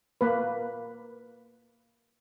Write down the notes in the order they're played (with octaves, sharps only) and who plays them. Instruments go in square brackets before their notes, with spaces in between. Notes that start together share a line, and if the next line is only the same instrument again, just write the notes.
[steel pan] A#3 B4